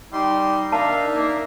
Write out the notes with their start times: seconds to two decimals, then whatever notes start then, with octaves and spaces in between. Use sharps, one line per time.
0.13 G3 D#4 C6
0.72 D4 A#4 E5 F5 A5
1.14 A#3